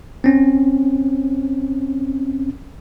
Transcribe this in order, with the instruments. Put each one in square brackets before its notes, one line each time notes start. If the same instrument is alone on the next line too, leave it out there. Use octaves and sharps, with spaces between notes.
[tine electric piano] C4 C#4